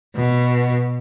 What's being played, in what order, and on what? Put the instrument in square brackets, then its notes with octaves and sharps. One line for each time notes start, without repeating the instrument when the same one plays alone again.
[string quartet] B2